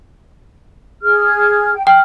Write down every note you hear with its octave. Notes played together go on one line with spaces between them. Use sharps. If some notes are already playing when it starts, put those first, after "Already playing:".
G#4 F6
G5
G5 F6